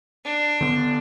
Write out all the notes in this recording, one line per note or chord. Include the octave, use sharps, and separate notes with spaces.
D4
D3 B3